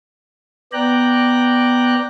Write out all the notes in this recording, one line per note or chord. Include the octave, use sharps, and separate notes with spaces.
B3 D5 G5 A#5 F#6